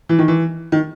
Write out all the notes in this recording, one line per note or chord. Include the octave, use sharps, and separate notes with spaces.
E3
D#3
E3
D#3